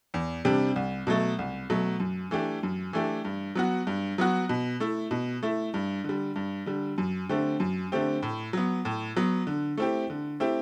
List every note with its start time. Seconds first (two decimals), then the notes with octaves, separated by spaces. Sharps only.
0.14 E2
0.45 C3 G3 D4 G4
0.76 C2
1.07 B2 F#3 A3
1.39 C2
1.70 B2 F#3 A3
2.00 F#2
2.31 E3 A3 D4 G4
2.63 F#2
2.93 E3 A3 D4 G4
3.25 G2
3.55 F#3 B3 F#4
3.87 G2
4.18 F#3 B3 F#4
4.49 B2
4.80 A3 E4
5.11 B2
5.43 A3 E4
5.74 G2
6.04 D3 G3
6.36 G2
6.66 D3 G3
6.98 F#2
7.29 D3 A3 C4 G4
7.60 F#2
7.92 D3 A3 C4 G4
8.23 A2
8.53 F#3 B3
8.85 A2
9.16 F#3 B3
9.47 D3
9.77 A3 C4 E4 G4
10.10 D3
10.40 A3 C4 E4 G4